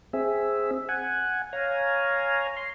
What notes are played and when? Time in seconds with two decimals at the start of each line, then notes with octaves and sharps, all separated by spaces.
0.13 C4 G#4 E5
0.89 F#5 G#5
1.53 C#5 F5 G#5 A#5
2.57 C6